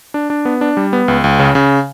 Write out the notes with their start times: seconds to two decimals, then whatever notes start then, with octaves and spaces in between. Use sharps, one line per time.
0.14 D4
0.30 D4
0.45 B3
0.61 D4
0.77 G3
0.93 B3
1.08 C#2
1.24 C#2
1.39 C#3
1.55 C#3